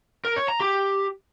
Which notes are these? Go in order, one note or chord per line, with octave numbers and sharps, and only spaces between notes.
A#4
C#5
A#5
G4